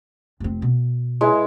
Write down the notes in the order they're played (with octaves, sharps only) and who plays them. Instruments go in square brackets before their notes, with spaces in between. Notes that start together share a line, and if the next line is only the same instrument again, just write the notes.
[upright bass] F1 C4
B2
[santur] G#3 E4 B4